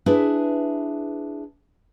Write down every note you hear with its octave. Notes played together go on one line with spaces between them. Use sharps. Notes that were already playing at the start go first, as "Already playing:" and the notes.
D4 E4 G#4 B4 E5